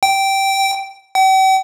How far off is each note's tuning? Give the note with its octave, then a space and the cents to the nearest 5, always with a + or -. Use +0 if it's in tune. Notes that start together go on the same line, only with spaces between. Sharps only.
G5 -10
G5 -45